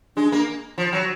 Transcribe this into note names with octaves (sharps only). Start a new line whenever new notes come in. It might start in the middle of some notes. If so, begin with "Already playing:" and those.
G#3 D4
A#3
F3
F#3